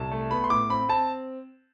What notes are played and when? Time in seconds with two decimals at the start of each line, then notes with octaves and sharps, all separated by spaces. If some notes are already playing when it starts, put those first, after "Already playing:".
Already playing: C2 A5
0.11 A3
0.31 B3 B5
0.44 C6
0.50 A2 D6
0.70 C4 B5
0.89 C4 A5